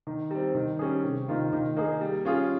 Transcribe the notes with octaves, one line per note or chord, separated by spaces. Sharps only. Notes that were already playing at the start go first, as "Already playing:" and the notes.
D#3
G3 C4
D#3
G3 C#4 G#4
C3
D#3 A#3 F4
D#3
A#3 D#4 G#4
G3
C#4 F4 G#4